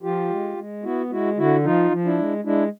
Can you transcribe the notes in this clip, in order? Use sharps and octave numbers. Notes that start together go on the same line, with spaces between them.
F3 F4 G4
G#3
G#3
B3 E4 F#4
G#3 E4 F#4
D3 E4 F#4
F3 D#4 F4
F3
D4 E4
G#3
G#3 D4 E4